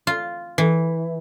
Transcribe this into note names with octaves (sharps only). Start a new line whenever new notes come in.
F4
E3